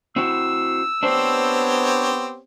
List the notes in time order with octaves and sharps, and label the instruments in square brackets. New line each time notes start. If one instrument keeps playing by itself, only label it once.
[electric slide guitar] C4 E4 F#4 [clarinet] E6
[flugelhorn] B3 [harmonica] C4 G4 C#5 [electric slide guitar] D4 C5